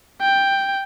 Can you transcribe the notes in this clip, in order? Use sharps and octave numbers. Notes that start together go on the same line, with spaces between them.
G5